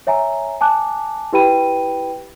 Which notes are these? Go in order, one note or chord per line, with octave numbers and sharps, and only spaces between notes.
C#5 E5 G#5 A#5
G#5 A5 D6 F#6
E4 G4 B4 G5 B5 D#7